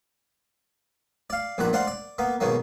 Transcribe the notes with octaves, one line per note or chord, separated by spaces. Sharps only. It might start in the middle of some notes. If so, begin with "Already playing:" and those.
D5 F5
A#1 G2 A#2 F#5 A#5
D4 C5 D5 F5 F#5
D5
A#3 B3
G#2 B2 D#3 F#3 A#3